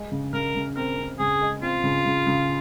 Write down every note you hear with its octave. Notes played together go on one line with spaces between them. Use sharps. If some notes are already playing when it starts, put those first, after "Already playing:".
Already playing: G#3
C#3
C#3 A#4
C#3
C4 A#4
C4
C#3 G#4
G#3
C4 F4
C#3
C#3
C#3